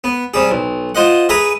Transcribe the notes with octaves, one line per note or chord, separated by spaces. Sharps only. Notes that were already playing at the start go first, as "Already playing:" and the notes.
B3
C3 G3 G#4
B1
F4 C5 D#5 F#5
G#4 B4 E5 A#5 D#6